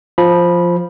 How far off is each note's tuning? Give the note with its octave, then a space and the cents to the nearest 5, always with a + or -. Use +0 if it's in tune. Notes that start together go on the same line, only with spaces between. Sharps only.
F3 +0 B5 -15